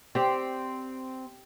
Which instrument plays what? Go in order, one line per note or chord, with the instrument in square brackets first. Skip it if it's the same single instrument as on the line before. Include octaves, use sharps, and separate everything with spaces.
[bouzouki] C4 [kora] G4 D5